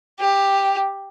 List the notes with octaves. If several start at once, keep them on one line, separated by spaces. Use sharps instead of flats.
G4